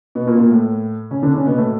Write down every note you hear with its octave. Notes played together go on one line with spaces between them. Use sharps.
B2 B3
A#2 A#3
A#2 A#3
A2 A3
C#3 C#4
D3 D4
C#3 C#4
B2 B3
A2 A3